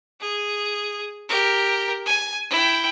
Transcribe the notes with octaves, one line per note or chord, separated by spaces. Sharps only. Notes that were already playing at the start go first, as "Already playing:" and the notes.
G#4
G4 A#4
G#5
E4 G5